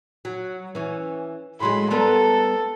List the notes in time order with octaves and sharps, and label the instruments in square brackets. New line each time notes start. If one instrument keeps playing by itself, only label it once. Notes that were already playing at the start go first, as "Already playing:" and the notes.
[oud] F#3
E3 C#4
[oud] A2 F#3 G#3 [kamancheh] B5 C6
[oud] G3 B3 A#4 [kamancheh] A4